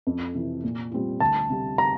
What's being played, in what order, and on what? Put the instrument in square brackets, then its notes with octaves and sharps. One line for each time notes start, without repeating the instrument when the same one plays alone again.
[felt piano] F2
C3 E3
A#2
G3 C4 F4
[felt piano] D2 [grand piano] A5
[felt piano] C3 G3
[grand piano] A#5